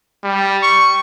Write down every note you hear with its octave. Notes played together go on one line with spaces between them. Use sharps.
G3
C#6